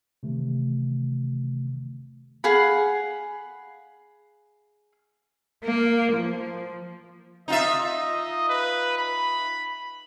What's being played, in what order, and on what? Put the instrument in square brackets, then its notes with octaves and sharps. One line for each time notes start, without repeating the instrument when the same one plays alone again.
[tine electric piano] C3 D#3 E3 A3
[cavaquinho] G#4 F5 F#5 B5
[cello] A#3
F3
[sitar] D#4 F4 E5 [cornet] D#5
[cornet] B4
B5